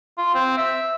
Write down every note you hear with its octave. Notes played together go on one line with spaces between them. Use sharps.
F4
C4
E5